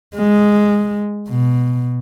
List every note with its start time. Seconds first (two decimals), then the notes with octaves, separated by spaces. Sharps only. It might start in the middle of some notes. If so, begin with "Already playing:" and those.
0.15 G#3
1.29 B2